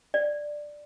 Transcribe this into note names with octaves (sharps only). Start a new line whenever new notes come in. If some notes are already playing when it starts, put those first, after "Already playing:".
D5